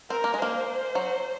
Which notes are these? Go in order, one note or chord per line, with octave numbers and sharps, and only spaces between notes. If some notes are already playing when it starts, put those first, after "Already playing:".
C4 A#4
A#3
G#3
A#3 C5
F#3